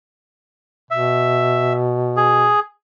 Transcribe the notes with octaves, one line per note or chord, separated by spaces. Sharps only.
B2 E5
G#4